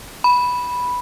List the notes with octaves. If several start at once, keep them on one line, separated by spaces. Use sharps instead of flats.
B5